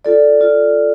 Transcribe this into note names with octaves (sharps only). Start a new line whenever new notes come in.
F4 A4 D5
F4 A4 D5